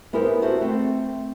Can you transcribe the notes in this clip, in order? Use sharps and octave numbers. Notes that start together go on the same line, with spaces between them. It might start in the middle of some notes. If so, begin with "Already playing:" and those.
B3 E4 G4 G#4 A#4 C5
F#4 A4 C5 E5
A3 C4